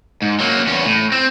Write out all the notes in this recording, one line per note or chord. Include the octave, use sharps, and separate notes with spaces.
G#2
F#3 A#3
E2 C#4
A2
C4